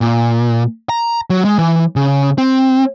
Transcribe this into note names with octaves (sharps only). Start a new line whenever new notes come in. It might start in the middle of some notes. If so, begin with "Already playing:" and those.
A#2
A#5
F#3
G#3
E3
C#3
C4